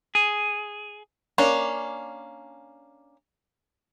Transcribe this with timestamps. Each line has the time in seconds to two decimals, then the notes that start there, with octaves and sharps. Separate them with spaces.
0.15 G#4
1.38 A#3 C#4 D4